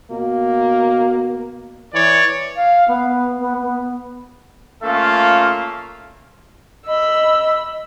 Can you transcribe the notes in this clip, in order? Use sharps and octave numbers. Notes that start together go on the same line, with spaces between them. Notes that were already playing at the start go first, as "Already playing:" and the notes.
B2 A#3
E3 C#5 D5
F5
B3
B3
B3
A3 A#3 C#4 F4 A4 F5
D#5 B5 E6